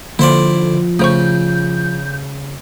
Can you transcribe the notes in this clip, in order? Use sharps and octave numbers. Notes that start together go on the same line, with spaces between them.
D3 F3 A#3 E4 C5 D5
C#3 A3 C5 C#6 G6